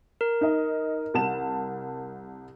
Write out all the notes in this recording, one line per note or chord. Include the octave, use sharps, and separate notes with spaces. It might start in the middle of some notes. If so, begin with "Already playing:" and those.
A#4
D#4 D#5
C2 A5 E7